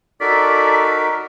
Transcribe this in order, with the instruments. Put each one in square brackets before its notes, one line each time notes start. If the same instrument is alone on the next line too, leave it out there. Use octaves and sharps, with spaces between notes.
[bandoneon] D#4 F#4 A#4 [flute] A4 [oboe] D5 [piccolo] B6